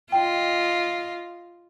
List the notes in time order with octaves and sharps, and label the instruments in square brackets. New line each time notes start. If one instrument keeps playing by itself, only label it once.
[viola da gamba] F4 D#5 [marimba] G5